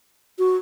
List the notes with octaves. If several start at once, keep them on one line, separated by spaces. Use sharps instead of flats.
F#4